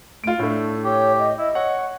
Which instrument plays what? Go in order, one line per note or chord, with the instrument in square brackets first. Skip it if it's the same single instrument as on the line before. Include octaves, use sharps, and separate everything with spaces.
[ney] A3 [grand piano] F4 D7
[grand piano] A2 A3 [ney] D4
[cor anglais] G4 [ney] C#5
[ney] D#5
[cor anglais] E4 [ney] D#5
[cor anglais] C#5 [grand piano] F#5